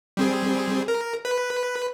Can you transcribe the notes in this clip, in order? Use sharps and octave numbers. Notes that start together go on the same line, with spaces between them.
G3 C4 G#4
A#4
B4